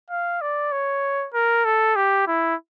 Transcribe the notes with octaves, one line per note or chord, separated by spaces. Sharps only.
F5
D5
C#5
A#4
A4
G4
E4